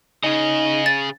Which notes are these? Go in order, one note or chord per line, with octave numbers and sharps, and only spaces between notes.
C#3 D#4 G#4 D#5
A6